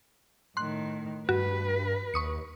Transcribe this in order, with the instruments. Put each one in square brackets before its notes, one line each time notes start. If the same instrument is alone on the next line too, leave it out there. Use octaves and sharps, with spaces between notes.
[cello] A2 D#3 [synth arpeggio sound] C6 F#6
[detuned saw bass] G2 [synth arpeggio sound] F#4 [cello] B4
[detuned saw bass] D#2 [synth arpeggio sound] C#6 D#6 C#7